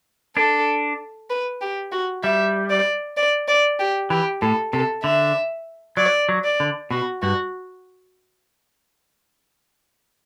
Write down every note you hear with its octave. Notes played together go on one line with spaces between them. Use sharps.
D4 A4
B4
G4
F#4
G3 E5
D5
D5
D5
G4
E3 G4
A2 A4
C3 A4
D3 E5
F#3 D5
F#3
D5
D3
B2 F#4
G2 F#4